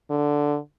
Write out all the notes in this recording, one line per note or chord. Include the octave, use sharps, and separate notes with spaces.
D3